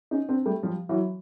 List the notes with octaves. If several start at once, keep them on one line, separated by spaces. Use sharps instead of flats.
C#4 D#4
C4 D4
G3 A3
F3 G3
E3 F#3